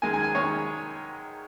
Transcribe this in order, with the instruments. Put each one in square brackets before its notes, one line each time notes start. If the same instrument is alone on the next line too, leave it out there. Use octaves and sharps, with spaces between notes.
[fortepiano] F#2 D#3 G#3 G#5
G#5
G#5
F#2 D#3 G#3 C#5